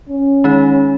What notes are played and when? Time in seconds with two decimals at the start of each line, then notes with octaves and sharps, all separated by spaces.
0.09 C#4
0.44 D#3 G#3 D#4